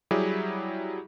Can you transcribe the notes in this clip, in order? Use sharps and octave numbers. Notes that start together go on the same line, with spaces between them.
F#3 G3 E4 G4 G#4